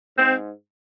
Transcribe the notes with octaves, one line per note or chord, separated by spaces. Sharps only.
G#2 C4